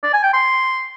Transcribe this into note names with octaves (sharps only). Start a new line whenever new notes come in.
D5
G#5
G5
C6